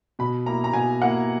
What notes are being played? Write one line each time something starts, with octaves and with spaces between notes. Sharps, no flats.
B2 B5
A#3 E4 A#5
A#5
B2 G#5
A#3 E4 F#5